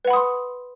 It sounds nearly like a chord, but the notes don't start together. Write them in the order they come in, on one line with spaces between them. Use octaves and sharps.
B4 F#5 B5 D#6 C6